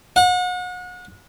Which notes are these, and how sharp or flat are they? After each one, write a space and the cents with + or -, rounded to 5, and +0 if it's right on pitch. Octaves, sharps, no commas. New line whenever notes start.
F#5 -35